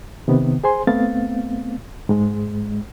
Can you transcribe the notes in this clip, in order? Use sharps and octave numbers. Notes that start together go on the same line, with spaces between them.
C3 D#3 B3
G#4 C5 G#5 C6
A3 B3 C4 F5 A6
G#2 G#3